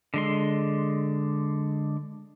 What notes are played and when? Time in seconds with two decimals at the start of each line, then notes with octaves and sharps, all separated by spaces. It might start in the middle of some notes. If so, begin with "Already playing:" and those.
0.14 D3 G#3 C6